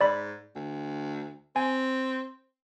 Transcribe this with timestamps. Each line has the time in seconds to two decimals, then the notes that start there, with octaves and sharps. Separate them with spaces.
0.01 G#2 D5 B5
0.56 D2
1.56 C4 G#5